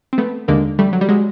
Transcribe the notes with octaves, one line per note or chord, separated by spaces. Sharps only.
C4
A3 B3
D#2 D3 G#3 A#3
G3 A3
F#3
G3
F#3 G#3